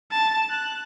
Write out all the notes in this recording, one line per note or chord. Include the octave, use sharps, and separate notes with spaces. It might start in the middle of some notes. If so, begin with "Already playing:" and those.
A5
F#6